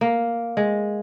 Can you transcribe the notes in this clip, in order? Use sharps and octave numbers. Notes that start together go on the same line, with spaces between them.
A#3
G#3